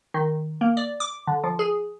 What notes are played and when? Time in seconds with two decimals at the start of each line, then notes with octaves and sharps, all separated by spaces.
0.14 D#3
0.61 A#3
0.77 D5
1.00 D6
1.27 D3
1.44 F3
1.59 G#4